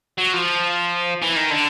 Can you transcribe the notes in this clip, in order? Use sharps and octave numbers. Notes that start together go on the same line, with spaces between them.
F#3
F3
E3
D#3
D3